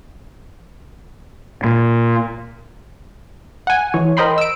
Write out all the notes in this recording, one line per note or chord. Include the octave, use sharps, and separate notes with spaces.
A#2
F#5 G#5
E3 C#5
A#4 C5 D#5 G5 B5 C6
E6 D7